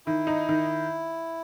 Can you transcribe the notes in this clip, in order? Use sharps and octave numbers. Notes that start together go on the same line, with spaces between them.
D#3 E4
D#4
D#3